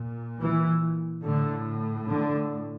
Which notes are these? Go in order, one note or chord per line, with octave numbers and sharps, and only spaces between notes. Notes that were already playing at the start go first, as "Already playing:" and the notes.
Already playing: A#2
E3
A2 D3
D3